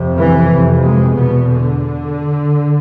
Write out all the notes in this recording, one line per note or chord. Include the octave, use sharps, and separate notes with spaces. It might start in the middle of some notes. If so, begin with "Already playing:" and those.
Already playing: F2 C3
E3
F2 C3
G#3
E2 B2 B3
D3